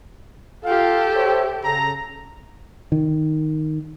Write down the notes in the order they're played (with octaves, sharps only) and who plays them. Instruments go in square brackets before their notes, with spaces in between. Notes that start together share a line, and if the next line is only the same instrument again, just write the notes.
[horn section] F4 F5 [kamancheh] G4 A4
[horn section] C5 C#5 E5
C#3 A4 A#5
[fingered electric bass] D#3